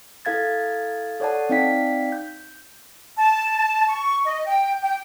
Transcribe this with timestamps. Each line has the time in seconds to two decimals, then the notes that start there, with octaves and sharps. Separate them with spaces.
0.25 E4 A4 F5 G#6 A6
1.20 A4 C#5 D5 F#5 A5
1.49 C4 D#4 D5 F5 G5 B6
2.12 G6
3.18 A5
3.89 C#6
4.25 D#5
4.47 G5
4.83 G5